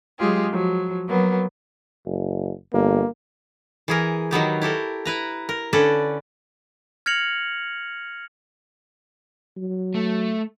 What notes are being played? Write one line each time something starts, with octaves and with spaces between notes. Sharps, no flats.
F#3 G#3 F4 G4 G#4
F3 F#3
F#3 A#3 B3
F#1
G1 A#3
E3 G#4 A#4
D#3 F#3 B3 G4
E4 G4 A4 A#4
E4 B4 A#5
A#4
D3 C#4 A4 B4 D5
F6 G#6 A#6 C#7 F7 F#7
F#3
A3